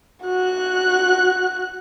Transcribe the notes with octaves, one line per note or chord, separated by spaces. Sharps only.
F#4 F#6